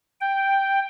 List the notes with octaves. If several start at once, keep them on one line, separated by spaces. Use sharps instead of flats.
G5